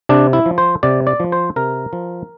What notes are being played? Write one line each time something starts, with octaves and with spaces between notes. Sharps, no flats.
C3 D4
E4
F3
C5
C3 D5
D5
F3
C5
C3 A#4
F3